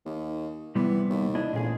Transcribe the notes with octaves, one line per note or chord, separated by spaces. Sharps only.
D#2
C3 E3 G3 B3
D#2
D4 E4 D#5
A1 A#2 G#4